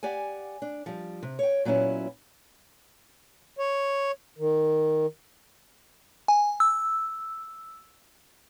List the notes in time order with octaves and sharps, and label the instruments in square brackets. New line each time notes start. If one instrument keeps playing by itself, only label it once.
[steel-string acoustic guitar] G4 D5 F#5 G#5
D4
F3 G3
C3
C#5 G5
A#2 F#3 B3 C#4 E4
[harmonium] C#5
D#3
[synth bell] G#5
E6